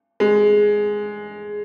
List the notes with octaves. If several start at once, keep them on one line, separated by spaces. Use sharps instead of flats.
G#3